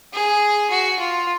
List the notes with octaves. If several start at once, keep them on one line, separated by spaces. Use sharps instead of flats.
G#4
F#4
F4